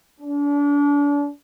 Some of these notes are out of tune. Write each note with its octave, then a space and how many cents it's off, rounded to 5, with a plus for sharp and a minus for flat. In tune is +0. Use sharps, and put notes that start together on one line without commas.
D4 -35